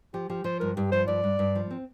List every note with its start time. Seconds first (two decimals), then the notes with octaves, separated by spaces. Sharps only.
0.14 F3 G4
0.30 F3 G4
0.44 F3 C5
0.60 G2 A#4
0.77 G2 G4
0.92 F3 C5
1.08 G2 D5
1.24 G2
1.39 G2
1.55 F3
1.71 C4